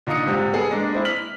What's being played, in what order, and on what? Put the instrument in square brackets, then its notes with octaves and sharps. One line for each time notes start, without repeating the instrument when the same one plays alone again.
[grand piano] A#2 D3 D#4 F5 D#6 C#7
G#2 C3 G3
B3 G#4 A4
G#3 A#3 D4
G#3 C4 E4
F6 B6 F#7